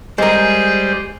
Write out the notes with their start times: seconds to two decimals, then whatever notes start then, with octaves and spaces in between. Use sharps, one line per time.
0.18 G3 G#3 G#4 A#4 C5